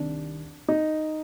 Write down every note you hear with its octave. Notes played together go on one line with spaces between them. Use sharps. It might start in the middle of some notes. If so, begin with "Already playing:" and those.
Already playing: C2 C3 D#3 D4
D#4